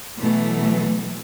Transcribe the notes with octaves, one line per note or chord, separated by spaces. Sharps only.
B2 E3 F#3 A3